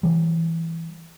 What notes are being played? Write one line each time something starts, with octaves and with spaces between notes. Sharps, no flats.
E3 G3